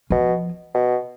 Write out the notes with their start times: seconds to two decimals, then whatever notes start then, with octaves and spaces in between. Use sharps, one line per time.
0.10 B2 F3
0.74 B2